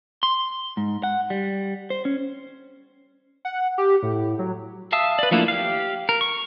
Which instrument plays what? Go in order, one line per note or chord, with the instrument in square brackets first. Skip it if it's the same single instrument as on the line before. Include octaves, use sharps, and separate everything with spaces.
[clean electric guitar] C6
G#2
F#5
G3
C5
C#4
[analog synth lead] F#5
G4
A2
F#3
[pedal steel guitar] E5 F5 A5 D#6 E6
B4 D5
F3 A3 A#3 D4 E4
G4 F5
A#4
C#6